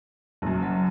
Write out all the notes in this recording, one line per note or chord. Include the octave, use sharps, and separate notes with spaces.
F#1 F#2
F#3